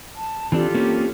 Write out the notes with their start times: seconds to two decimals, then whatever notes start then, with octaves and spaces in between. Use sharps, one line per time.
0.15 A5
0.52 E3 C4 D4 F4 G4 A4
0.74 A#3 C4 C#4